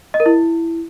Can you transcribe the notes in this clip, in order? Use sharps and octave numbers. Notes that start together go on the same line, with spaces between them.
D#5
A#4
E4